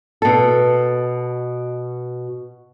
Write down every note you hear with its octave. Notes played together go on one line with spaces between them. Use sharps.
B2 A4